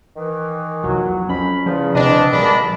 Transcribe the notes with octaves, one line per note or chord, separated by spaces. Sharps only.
D#3 E3
F1 C2 F3 F#3
F2 C#4 B5
E2 C#3 F3
D2 C3 C4 D4 D#5
A#2 F3 G3 G#3 A#3 D4 B5